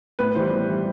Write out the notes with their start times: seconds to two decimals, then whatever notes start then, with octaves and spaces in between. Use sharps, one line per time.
0.19 A2 B4
0.35 E3 G3 C5
0.52 A2
0.69 E3 G3